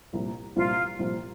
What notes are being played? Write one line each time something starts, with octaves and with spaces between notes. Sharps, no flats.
C2 A#2 F3
C2 A#2 F3 F4
C2 A#2 F3